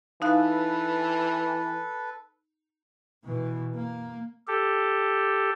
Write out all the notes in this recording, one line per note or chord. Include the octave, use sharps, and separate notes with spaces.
E3 D#4 A4 B4 F5 F#6
B2 E3
A#3
G4 A4